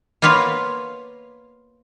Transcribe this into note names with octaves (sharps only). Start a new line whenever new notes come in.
A#3 B3 F4 B4 C#5